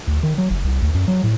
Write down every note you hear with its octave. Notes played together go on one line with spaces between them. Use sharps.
D2
D#3
F#3
F#1
C2
D2
F#2
F#3
A2